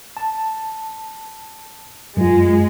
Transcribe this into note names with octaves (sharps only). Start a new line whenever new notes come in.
A5
F#2 G#3 F4